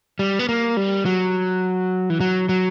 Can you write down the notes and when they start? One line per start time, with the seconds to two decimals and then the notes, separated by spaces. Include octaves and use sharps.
0.19 G3
0.39 B3
0.49 A#3
0.77 G3
1.05 F#3
2.10 E3
2.20 F#3
2.49 F#3